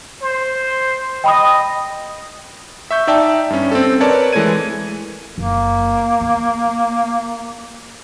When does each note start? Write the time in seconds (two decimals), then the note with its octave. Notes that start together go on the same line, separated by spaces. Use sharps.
0.22 C5
1.24 D#5 G5 B5 D#6
2.91 E5 C#6 G6
3.07 D#4 D5 E5 G5 A5
3.50 G2 C#4
3.72 C4 A4
4.00 A#4 B4 C#5 D5 A5
4.33 E3 G#3 A3 A4 G#6 D#7
5.38 F#1 A#3
6.21 B3